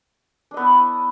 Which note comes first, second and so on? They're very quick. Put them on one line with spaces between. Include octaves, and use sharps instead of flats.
D4 D#5 B3 E4